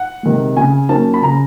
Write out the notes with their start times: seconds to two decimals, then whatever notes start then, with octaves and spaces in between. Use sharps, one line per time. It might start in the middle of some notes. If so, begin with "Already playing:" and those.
Already playing: F#5
0.23 C3 D#3 G#3
0.57 C#3 G#5
0.89 F#3 A#3 C#4 A5
1.14 B5
1.22 C#3 A#5